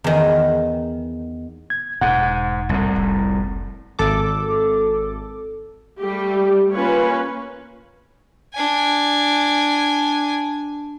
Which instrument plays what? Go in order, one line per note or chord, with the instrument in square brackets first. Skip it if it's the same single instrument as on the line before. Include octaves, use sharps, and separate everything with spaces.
[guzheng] E2 D#3
[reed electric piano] G#6
[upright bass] E1 [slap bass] G#2 [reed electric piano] F#5
[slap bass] C2 A2
[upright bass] F1
[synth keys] G#1 A4 D6
[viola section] G3 A3 G4
A#3 C#4 F4 B4 C#5
[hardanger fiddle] D4 G#5